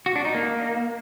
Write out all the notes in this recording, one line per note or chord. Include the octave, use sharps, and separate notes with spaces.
F#4
D4
D#4
A#3